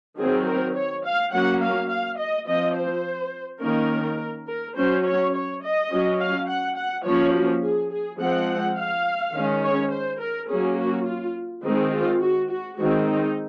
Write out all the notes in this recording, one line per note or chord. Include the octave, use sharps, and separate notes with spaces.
D#3 F#3 C4 G#4
A#4
C#5
F5
F#3 A#3 C#4 F#5
F5
F5
D#5
F3 C4 D#5
C5
D#3 A#3 C#4 A#4
A#4
F#3 C#4 C5
C#5
C#5
D#5
F#3 C#4
F5
F#5
F#5
F3 A#3 C#4 C#5
F#4
G#4
G#4
F3 G#3 C4 F#5
F5
D#3 G#3 C#4
C#5
C5
A#4
F#3 A#3 C#4 G#4
F#4
F4
D#3 G#3 C4 D#4
F4
F#4
F#4
D#3 G#3 C4 F#4
D#4